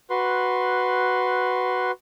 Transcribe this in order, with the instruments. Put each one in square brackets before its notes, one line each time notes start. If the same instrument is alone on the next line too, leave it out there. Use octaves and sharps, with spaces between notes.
[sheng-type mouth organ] F#4 B4 C6